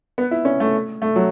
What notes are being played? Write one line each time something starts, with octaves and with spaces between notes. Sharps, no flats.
B3
E4
C#4
A3
A3
F#3